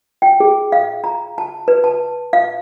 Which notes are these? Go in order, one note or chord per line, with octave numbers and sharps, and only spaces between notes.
G5
G#4
F5
A#5
A5
B4
A5
F5